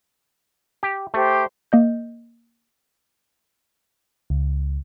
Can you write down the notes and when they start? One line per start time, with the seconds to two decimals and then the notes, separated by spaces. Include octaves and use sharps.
0.83 G4
1.14 A3 G4 C5
1.72 A#3 D#5 G6
4.30 C#2